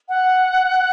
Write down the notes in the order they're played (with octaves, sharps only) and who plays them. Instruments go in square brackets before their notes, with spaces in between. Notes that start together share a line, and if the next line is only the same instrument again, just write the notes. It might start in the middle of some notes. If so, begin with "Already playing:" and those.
[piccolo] F#5